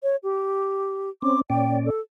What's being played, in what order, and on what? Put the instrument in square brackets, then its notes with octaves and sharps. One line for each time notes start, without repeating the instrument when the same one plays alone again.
[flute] C#5
G4
[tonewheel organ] C4 C#4 [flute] D6
[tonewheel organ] A#2 C#4 D5 [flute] G5
[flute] A4